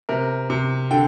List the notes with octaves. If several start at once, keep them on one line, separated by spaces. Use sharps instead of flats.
C3 A#4
C3
D3 G5